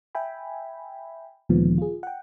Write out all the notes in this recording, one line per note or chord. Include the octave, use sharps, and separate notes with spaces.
E5 G5 G#5 B5
D2 A#2 D#3 F3 G#3 B3
F4 G#4
F#5 G5